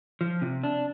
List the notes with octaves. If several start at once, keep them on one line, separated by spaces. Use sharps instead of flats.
F3
C3
D4